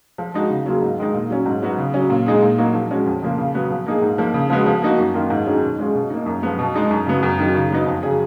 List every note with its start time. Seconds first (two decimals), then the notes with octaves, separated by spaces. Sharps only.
0.18 F3
0.34 G#3 D#4 F#4
0.50 C#3
0.66 F#3 A#3 F4 G#4
0.82 G#2
0.98 D#3 G#3 D#4
1.14 A#2
1.30 F#3 C#4
1.46 G#2
1.62 F#3 B3 F#4
1.78 C#3
1.94 F#3 C#4
2.10 A#2
2.26 G#3 D#4 G#4
2.42 A#2
2.58 F#3 A#3 D#4 F#4
2.74 F3
2.90 G#3 C#4 F#4
3.06 F2
3.22 C#3 F3 A#3 F4
3.38 C#3
3.54 F#3 B3 F#4
3.71 F3
3.86 A#3 D#4 G#4
4.02 G#2
4.18 F3 A#3
4.34 C#3
4.50 F3 G#3 B3 F#4
4.66 F3
4.82 A#3 D#4 F#4
4.98 F#2
5.14 D#3 A#3 F4
5.30 G#2
5.46 D#3 F#3 C#4 G#4
5.63 B2
5.78 G#3 C#4 F4 G#4
5.95 B2
6.10 A#3 D#4
6.26 F#2
6.43 F3 B3
6.59 B2
6.74 G#3 D#4 G#4
6.90 F#2
7.06 C#3 F#3 B3
7.23 F#2
7.39 D#3 F#3
7.55 C#3
7.70 F#3 B3 D#4
7.86 F2
8.03 C#3 F#3 C#4 G#4